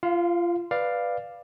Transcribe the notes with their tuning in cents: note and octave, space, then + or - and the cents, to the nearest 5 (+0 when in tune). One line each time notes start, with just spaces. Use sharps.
F4 -25 F5 +15
B4 +0 D5 +10 F5 +0